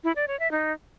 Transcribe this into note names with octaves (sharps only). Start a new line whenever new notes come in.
E4
D5
C#5
E5
D#4